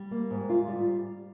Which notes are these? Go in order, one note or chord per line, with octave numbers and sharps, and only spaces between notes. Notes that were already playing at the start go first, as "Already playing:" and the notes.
Already playing: G3
A#3
G#2
F4
G3